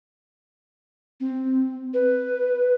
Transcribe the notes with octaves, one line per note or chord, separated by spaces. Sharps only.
C4
B4